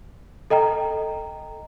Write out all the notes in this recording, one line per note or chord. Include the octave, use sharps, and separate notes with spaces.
A4 D#5 G5 A#5